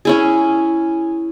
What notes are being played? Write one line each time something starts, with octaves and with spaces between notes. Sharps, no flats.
C#4 E4 G#4